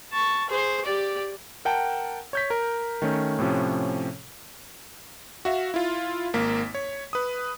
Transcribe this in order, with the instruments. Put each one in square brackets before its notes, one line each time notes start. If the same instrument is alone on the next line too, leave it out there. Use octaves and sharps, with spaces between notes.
[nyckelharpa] A5 C#6
G#4 C5
G4 D5
[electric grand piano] A#4 F#5 G5 A5
C#5 G6 B6
A#4
D#3 A3 C#4
A2 C3 F3 C#4
F#4 E5 F5
E4 F4
G#1 A#3 B6
C#5
B4 D#6